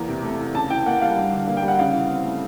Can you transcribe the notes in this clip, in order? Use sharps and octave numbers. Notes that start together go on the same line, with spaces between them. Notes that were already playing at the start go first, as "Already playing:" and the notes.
Already playing: E2 A#3 A#5
C3
A3
E3
C#3 A5
E3 G5
A#3 F#5
G3 F5
G2
D3
A#3
G5
G3
F#5
C#3 F5
E3
C4
A3